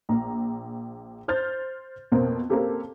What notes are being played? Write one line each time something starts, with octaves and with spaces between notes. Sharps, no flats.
A#1 A#5
C5 F6 G6 A6
F2 B2 A#3 C4
A#3 C4 C#4 G4 A4